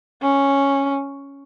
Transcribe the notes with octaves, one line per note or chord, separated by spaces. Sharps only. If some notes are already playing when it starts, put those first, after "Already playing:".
C#4